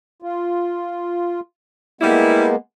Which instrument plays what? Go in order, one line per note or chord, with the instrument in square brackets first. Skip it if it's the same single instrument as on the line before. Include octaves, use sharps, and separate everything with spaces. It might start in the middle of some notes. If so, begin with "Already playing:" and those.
[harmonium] F4
[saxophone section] G3 E4 [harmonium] G#3 A#3 B3